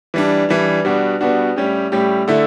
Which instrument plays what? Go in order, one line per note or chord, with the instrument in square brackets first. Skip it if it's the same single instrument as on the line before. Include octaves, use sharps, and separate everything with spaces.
[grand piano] E3 G3 D4
E3 G3 D4
B2 G3 B3 D4 F#4
B2 G3 B3 D4 F#4
A2 G3 C#4 G4
A2 G3 C#4 G4
D3 A3 E4